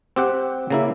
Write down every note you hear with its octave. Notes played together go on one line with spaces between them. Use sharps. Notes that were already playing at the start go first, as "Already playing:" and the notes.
C4 G4 F#5
C#3 A#3 E4